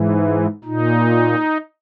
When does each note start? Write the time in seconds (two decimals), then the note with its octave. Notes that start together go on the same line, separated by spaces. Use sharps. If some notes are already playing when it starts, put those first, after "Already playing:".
Already playing: G#2 E3
0.64 A#2 D#4